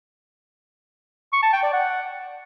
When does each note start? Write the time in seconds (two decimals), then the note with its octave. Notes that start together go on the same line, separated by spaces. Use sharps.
1.33 C#6
1.43 A5
1.53 G5
1.63 D5
1.73 F#5